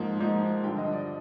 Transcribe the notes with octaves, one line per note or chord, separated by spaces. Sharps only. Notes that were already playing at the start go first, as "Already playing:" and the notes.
Already playing: G#2 F3 A#3 D#4
G#2 F3 A#3 D#4
G2 D3 F3 G5
D#5
D5